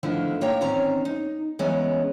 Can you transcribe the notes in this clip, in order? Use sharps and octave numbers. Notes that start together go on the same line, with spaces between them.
D3 D#3 F3 A3 B3 E4
A2 A#3 C#5 G5 A#5
E2 D#3 C4 C#4 A#5
D#4
E3 G#3 B3 C#4 A#5